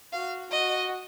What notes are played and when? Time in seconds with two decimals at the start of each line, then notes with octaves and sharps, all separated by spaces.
0.13 F#4 F5
0.51 F#4 D#5